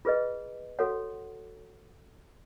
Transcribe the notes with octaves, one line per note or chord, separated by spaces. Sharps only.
F4 G#4 B4 D#5
F#4 A4 C#5 F#5